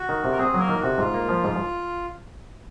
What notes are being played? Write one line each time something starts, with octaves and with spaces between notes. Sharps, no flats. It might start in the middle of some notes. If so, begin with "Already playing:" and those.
Already playing: F#4
D#3
C3
A#4
C4 G#4
F#3 A#3 A#4
D#3
C3 F#4
G#2 F4
A#3
F3
G#2